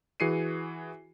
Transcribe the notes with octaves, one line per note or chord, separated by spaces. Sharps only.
E3 F#4 G#4 C7 C#7 D#7